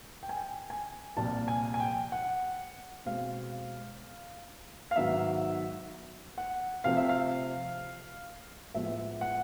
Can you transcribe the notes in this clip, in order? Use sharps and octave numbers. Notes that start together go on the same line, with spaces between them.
G5
G#5
G5
G#5
C2 A#2 F3 A5
G#5
G#5
G5
F#5
B2 G#3 C4 F5
F5
G#2 D#3 F#3 B3 E5
F#5
C3 F3 A3 C4 F5
E5
F5
A2 F3 G#3 B3 E5
F#5